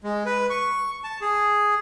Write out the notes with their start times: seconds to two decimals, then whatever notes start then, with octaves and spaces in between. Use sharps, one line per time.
0.04 G#3
0.26 B4
0.50 C#6
1.04 A5
1.22 G#4